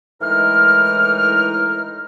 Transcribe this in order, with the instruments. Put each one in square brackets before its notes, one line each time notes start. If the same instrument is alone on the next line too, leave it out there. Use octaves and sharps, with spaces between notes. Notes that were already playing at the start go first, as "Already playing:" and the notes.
[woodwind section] A2 E3 G#3 D#4 A#4 F6